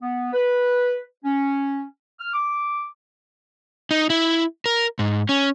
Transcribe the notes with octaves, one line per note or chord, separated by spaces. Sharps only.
B3
B4
C#4
F6
D6
D#4
E4
A#4
G#2
C#4